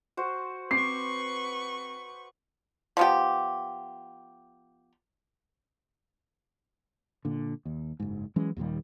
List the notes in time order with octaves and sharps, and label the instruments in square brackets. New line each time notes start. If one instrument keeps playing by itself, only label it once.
[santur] F#4 C5
[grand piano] C4 [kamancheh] B4 C#6 [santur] D6 [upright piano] C7
[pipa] F3 B3 G4
[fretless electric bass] A#2 D3
D#2
F#1 G#2
E3 F#3 G#3 C#4
D#2 A#2 D#3 G3